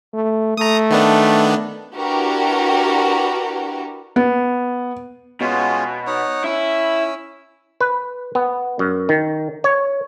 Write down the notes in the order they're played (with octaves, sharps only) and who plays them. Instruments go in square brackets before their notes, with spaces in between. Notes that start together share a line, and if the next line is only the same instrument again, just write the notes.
[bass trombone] A3
[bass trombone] A3 [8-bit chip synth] A#5 D#6
[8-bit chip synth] D#3 B3 D4
[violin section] D4 E4 F#4 G4 A#4 B4
[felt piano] B3
[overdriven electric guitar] B2 [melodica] G#3 C#4 F4
[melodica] D#4 C#5 F#5
[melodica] C#4 E6 [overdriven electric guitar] E4
[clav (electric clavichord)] B4
B3
F#2
D#3
C#5